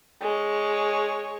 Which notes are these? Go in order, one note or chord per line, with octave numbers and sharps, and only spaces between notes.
G#3 C#5